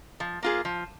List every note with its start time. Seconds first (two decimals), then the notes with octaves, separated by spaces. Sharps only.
0.20 F3
0.43 A#3 F4 G#4
0.65 F3